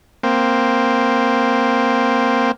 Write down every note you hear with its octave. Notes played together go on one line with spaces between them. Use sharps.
A#3 C4